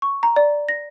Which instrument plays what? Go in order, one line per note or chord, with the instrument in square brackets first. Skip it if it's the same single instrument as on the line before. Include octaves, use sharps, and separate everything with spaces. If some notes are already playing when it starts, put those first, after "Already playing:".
[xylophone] C#6
A#5
D5
A#6